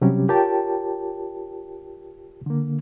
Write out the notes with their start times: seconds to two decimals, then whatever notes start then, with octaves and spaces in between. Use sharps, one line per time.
0.02 C3 F#3 G3 C#4 G4
0.29 F4 G4 A#4 C#5 G5 A5
2.46 D3 A#3